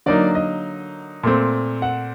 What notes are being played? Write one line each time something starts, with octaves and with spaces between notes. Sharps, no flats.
D3 F#3 A#3 D#4 D5
D#5
A#2 A3 C4
F#5